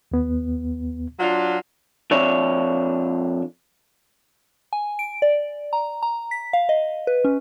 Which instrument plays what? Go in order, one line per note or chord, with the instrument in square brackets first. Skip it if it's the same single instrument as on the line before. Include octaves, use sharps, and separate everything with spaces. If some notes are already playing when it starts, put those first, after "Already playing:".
[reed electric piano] D#2 B3
[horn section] F#3 D4 F4
[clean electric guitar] F2 D4 C#5 E5
[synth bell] G#5
D7
D5
A#5
A#5
B6
F5
D#5
B4
C#4